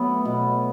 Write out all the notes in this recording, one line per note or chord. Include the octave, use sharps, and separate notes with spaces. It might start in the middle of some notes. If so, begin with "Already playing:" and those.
Already playing: F#3 A3 B3
B2